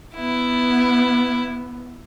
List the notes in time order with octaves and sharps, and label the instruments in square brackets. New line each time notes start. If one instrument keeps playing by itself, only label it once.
[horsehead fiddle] B3 [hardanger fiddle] E4